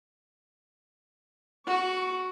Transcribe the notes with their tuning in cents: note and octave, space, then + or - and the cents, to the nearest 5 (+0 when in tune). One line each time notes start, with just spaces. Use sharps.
F#4 +0 C#6 +30